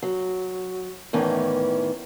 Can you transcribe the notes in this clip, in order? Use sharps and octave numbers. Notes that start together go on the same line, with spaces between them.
F#3
E2 A2 D#3 E3 C#4